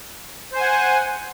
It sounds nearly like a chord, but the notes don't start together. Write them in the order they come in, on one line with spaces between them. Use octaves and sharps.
C5 G#5 F#5